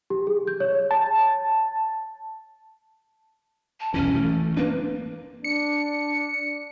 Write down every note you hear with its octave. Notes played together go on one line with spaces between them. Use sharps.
G4
G#4
G6
C#5
A5
A5
B1 E2 E3 C#4
E3 A3
A#3 C4 D4 B4
D4 C#7